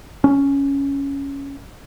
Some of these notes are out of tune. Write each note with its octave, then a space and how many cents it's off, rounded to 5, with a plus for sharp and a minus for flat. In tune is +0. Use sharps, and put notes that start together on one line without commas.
C#4 +5